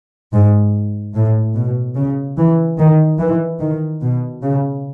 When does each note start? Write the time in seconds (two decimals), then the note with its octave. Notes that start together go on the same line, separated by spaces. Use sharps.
0.33 G#2
1.14 A2
1.55 B2
1.96 C#3
2.38 E3
2.78 D#3
3.19 E3
3.60 D#3
4.01 B2
4.42 C#3